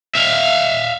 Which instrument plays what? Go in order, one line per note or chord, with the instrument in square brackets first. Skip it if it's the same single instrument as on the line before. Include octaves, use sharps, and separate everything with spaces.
[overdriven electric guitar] E5 F5